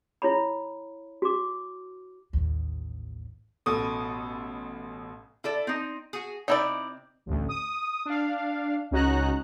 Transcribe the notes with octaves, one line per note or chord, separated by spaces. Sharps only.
E4 C#5 B5
F#4 D6
A1 D#2
A1 B2 A4 D#6
E4 A4 D5
C4 D#4
F#4 G#4
C3 C4 D#4 E4 D5
A1 D2
D#6
D4 F5
C#2 C#4 D#4 F#4 A#5 F#6